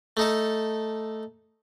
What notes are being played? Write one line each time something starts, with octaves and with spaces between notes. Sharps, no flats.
A3 D#4 A4